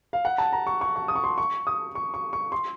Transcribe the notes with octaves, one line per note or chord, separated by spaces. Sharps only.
F5
F#5
A5
A#5
C#6
C#6
C#6
D#6
C#6
C6
C#6
D#6
C#6
C#6
C#6
C6